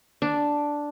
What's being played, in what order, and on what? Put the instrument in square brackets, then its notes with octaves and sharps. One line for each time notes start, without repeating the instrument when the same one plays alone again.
[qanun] D4